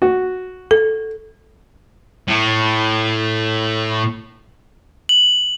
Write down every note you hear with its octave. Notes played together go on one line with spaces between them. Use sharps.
F#4
A4
A2 A3
F#7